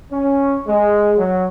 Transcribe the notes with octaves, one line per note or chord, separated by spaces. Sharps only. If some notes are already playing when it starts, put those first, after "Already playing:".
C#4
G#3
F#3